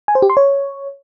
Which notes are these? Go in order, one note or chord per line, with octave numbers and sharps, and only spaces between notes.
G#5
C5
G4
C6
C#5